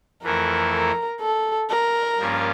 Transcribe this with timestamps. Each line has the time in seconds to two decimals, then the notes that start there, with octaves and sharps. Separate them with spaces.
0.23 F2 E3 A3 E4 A#4
0.72 A#4
1.21 A4
1.70 A#4
2.19 G2 F3 A#3 C#4 F4